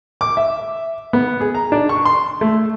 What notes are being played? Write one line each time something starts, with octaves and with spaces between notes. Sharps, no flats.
D6
E5
B3
G#4
A#5
D4
C#6
C6
A3